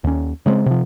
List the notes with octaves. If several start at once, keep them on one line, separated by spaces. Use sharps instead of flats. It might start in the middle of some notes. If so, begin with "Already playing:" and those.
D#2 C#4
C#3 G#3 A3 C4
C3 F3